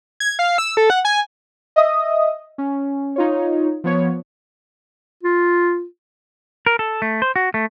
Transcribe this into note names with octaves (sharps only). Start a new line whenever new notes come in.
G#6
F5
E6
A4
F#5
G#5
D#5 E5 D#6
C#4
D#4 F4 C#5
F3 B3 C#5
F4
A#4
A4
A3
C5
F#4
A3